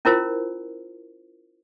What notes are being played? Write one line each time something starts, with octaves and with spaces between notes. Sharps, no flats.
C#4 E4 F4 A#4 C5